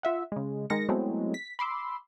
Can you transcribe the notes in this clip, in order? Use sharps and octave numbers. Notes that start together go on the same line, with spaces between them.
F4 E5 F#5
C#3 G#3
D#3 G#3 A#4 A#6 C#7
F#3 G#3 A3 B3 C4 E4
B6
B5 C6 D6 E6